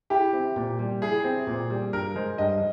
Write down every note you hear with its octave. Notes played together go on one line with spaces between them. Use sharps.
E4 G4
C4
A#2
G3
E4 G#4
C4
A#2
G3
G2 A#4
G#3 C5
G2 D#5